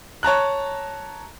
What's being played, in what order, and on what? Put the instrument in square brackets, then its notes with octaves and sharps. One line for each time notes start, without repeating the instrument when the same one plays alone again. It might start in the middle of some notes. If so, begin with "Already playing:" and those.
[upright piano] C#5 A5 A#5 F#6